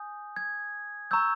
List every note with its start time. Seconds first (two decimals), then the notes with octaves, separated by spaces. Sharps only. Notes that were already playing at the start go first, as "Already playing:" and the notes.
Already playing: G#5 D#6 G6
0.36 G#6
1.11 A#5 C#6 E6 G6